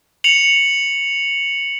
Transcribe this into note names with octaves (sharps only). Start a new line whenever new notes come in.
C#7 F7 F#7